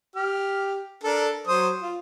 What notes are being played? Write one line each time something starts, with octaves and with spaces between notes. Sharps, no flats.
G4 F6
D4 A4 A#4
F#3 C5 D#6
F4